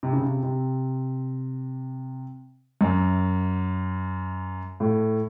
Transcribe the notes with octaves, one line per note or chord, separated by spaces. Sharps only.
C3
C#3
C3
C3
F#2
A2